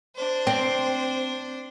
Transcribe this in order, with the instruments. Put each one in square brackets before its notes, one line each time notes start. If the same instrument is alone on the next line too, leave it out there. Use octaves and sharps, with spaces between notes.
[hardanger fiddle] D4 C5
[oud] C4